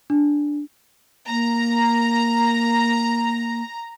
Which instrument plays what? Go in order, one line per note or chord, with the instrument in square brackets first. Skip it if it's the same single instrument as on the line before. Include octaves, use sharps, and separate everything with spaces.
[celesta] D4
[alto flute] A#3 [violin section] A#5